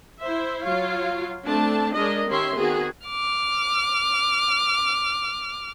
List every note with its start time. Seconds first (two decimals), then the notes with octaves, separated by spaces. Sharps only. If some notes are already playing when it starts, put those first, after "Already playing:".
0.22 E4 C5 E5
0.65 F#3 F4 C#5 F5
1.47 A3 C4 D4 A5
1.94 G#3 D4 A#4 D#5
2.29 D#3 C#4 G4 C#5 E5 C6
2.57 D#3 B3 C4 F#4 G#4
3.07 D6 F6